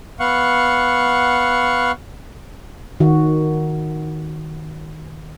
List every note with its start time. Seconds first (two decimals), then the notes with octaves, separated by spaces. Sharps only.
0.20 B3 F5 F#5 C#6
3.00 D#3 F#4